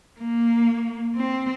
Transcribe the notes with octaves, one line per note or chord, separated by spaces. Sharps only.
A#3
C4